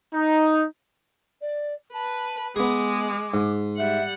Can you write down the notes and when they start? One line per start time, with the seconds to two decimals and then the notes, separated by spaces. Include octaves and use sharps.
0.15 D#4
1.41 D5
1.93 B4 A5
2.56 G#3 B3 G#4 D6
3.34 G#2
3.77 G3 E5 F#5